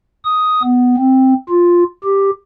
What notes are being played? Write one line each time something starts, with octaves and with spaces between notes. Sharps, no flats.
D#6
B3
C4
F4
G4